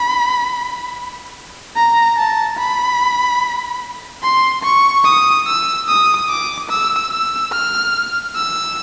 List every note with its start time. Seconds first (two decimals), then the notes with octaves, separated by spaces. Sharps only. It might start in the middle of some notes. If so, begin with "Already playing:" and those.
Already playing: B5
1.76 A#5
2.18 A5
2.58 B5
4.23 C6
4.64 C#6
5.05 D#6
5.47 E6
5.88 D#6
6.30 D6
6.70 E6
7.11 E6
7.52 F6
8.36 E6